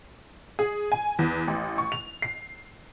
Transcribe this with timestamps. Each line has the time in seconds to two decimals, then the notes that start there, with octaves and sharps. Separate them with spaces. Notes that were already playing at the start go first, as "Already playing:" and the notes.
0.59 G#4
0.92 G#5
1.19 E2
1.48 A1
1.78 C#6
1.92 F7
2.22 C7